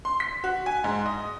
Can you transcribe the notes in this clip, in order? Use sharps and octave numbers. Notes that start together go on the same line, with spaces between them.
C6
B6
F#4
G#5
G#2
D#5